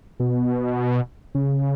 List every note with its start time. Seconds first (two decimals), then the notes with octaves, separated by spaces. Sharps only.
0.20 B2
1.35 C#3